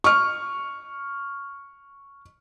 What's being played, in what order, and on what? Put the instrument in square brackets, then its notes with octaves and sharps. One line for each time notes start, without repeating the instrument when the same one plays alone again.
[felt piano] C#6 F6